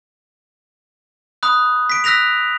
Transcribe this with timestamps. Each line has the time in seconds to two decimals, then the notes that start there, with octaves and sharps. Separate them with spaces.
1.43 B5 D#6 F#6
1.90 B6 D7
2.04 E6 F#6 A#6 B6 F7